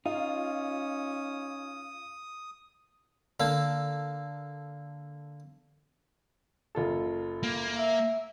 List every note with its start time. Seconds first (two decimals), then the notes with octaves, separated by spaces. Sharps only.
0.06 C#4 D#4 F4 D#6
3.40 D3 A#3
6.75 F#1 F4 A4
7.43 A#3
7.77 E5